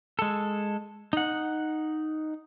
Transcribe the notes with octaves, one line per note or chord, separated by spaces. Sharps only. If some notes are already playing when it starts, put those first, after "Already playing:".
G#3 A4
D#4 F#5